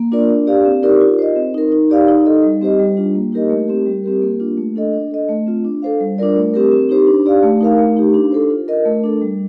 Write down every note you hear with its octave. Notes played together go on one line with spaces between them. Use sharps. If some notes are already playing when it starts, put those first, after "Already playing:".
Already playing: A#3
D4 F4 A#4 D5
D4
G4 D5 F5
C4
D#4 G4 A#4 D5
F4
C5 D#5
C4
D#4 A#4
D#4
G4 D5 F5
D#4
A4 D#5
G3
C4 G4 C5 D#5
G3
D4 F4
A#3
D#4 G4 A#4 D#5
A3
C4 G4
G3
C4 G4 A#4
A#3
D4 F4
A3
D4 A4 D#5
D4
A4 D#5
A3
C4 F4
D4
A4 C5 F5
G3
D4 F4 A#4 D5
A3
C4 G4 A#4
C4
D#4 G4 C5
D4
G4 D5 F5
A3
D#4 A#4 F5
A3
D#4 G4
D4
A4 C5
F4
A#4 D#5
A3
D4 A4
G3